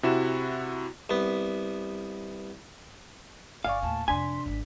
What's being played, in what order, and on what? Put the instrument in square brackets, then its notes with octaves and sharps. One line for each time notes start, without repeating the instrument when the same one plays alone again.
[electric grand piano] C3 E4 F#4 E7
[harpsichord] C2 B3
[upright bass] G1 [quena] D5 [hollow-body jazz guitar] F5 [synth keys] G#5 C#6
[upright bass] D#2 A2 [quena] A5
[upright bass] F2 C3 [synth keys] D4 B6 [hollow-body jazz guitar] G#5 [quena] C6
[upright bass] G#1 G#2